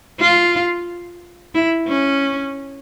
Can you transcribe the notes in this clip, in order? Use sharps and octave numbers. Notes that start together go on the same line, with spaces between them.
F4
E4
C#4